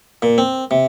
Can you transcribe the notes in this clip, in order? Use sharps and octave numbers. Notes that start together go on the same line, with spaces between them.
A#2
C4
C3